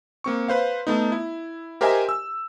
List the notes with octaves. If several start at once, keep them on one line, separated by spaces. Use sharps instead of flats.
A#3 C4 C#6
B4 C5 F5
A3 B3 D#4
E4
G4 A#4 C5 D#5 E5 G#5
E6